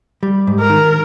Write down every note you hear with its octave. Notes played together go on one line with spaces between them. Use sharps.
G3
G#2
A#4
D#3